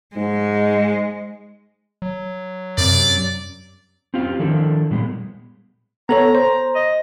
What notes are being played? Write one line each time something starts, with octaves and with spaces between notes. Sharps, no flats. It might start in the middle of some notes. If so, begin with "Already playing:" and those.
G#2 G#3
F#3
F#2 C3 D5
C4 C#4 F4 G4 F5
D#3 F3 D4 E4 A4 A#4
A#2 G3 G#3 B3
B3 A4 C#5 A#5
C5
D#5